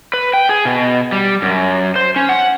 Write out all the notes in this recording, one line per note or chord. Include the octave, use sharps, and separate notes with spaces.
B4
G5
G#4
B2
G3
F#2
C5
C#4
F#5